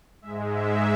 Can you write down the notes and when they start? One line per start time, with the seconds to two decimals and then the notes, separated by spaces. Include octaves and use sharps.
0.22 G#2 G#3 E5
0.50 E5